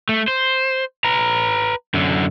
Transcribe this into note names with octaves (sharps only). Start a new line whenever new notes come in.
A3
C5
B4 A#5
F#2 D3